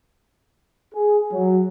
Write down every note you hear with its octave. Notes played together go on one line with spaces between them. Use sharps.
G#4
F#3